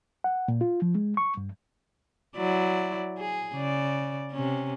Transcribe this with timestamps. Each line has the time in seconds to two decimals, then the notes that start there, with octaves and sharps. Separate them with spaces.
0.24 F#5
0.48 A#2
0.61 F4
0.82 F3
0.95 G#3
1.17 C#6
1.37 G2
2.37 F#3 E4 D5
3.18 G#4
3.54 C#3 D5
4.32 C3 C#4